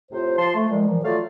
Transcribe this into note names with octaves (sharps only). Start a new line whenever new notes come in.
A2 C3 F4 C5
F3 A5 C6
A3
A#2 D3 F3 G3 G#3
A#2 E3 F3
F#3 A3 F4 A4 D5 F5